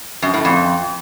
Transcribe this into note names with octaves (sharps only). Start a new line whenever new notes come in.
F#2
A2
F2